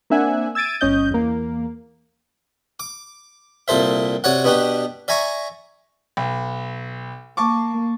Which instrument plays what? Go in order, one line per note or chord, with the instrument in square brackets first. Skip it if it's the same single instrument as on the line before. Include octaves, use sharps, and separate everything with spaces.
[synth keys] A#3 C4 D4 E5 F#5 G#5
E6 G#6 A6 D7 D#7
G1 C#4 D#5 G6
E2 A#3
[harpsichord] D6
C2 A#2 A4 C5 E5
C3 F#4 C#5 D5 F#5
B2 B3 D4 F#4 G4
D5 E5 G#5 A#5 C#6
[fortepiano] B1
[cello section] A#3 [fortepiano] A5 C#6 D6